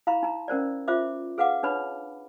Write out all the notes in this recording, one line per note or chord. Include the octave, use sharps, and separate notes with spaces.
E4 F5 A#5 B5 C#6
D#4 A#5
C#4 A#4 C5 D5
F4 C5 E5 D6
G#4 B4 F5 F#5 D6
D4 D#4 B4 C#5 B5